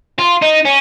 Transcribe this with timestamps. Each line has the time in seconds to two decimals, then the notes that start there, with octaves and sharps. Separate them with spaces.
0.19 F4
0.42 D#4
0.65 C#4